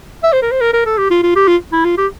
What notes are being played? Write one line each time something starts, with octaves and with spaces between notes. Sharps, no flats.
E5
C5
A#4
C5
A#4
A#4
A4
G4
F4
F4
G4
F4
E4
F4
G4